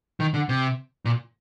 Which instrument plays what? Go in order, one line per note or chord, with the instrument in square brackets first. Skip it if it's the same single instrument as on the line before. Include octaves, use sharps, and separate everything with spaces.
[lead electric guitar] D#3
D3
C3
A#2